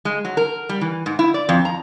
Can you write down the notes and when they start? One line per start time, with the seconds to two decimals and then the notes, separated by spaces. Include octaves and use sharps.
0.05 G#3
0.25 F#3
0.37 A#4
0.69 G3
0.81 E3
1.06 G#2
1.19 E4
1.34 D5
1.49 F2
1.65 A#5